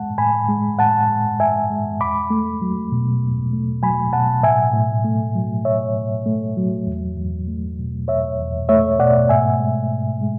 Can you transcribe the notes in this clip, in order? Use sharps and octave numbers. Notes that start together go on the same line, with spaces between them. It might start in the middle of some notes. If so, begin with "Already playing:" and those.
Already playing: A2 G#3 F#5 A5
A2 G#5 B5
G#3
A2 F#5 A5
G#3
A2 E5 G#5
G#3
E2 B5 D6
A3
F#3
B2
E2
A3
F#3 G#5 B5
B2 F#5 A5
A2 E5 G#5
A2
A3
F#3
A2 C#5 E5
A2
A3
F#3
E2
E2
A3
B2
E2 C#5 E5
E2
A3 C#5 E5
B2 D5 F#5
G#2 E5 G#5
G#3
G#2
G#3